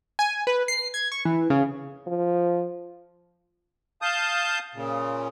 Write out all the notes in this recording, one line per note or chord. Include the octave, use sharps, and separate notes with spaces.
G#5
B4
C7
G#6
C#6
E3
C#3
F3
F5 A5 D#6 G6
A#2 C#3